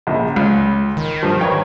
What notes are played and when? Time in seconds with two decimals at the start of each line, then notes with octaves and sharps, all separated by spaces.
0.07 A#1 C#3
0.36 C#2
0.97 D#3
1.23 G2 F3
1.41 B4 C#5 G5